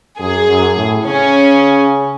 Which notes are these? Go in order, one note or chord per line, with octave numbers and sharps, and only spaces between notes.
F#2 G#4
F#2
A2
C#3 C#4